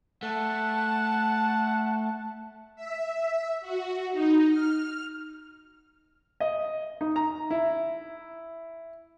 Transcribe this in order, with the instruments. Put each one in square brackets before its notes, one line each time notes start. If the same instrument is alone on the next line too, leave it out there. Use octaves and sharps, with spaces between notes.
[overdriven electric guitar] A3 [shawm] F#5 [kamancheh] A5
[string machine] E5
F#4
D#4
F6
[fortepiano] D#5
D#4
A#5
E4